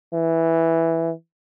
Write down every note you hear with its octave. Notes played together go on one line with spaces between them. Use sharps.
E3